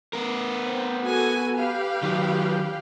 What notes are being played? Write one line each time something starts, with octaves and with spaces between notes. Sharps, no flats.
B3 A#4
C4
F#4 A4 G#5
G4 B4 F5
D#3 F#3